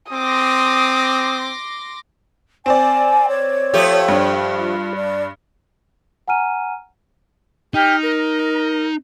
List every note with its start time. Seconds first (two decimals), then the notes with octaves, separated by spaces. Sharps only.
0.12 C4 C6 D6 D#6 A#6
2.66 C4 C5 D5 G#5
3.28 C#5
3.74 F3 A3 G4
4.08 G2 D4
4.60 F4
4.95 D5
6.28 F#5 G#5 A#5 F6 D#7
7.74 D#4 G4 F6
8.03 A#4